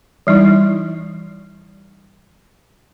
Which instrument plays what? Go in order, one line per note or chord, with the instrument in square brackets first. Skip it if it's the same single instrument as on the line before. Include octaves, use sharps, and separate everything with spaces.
[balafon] E3 G3 D#4 E4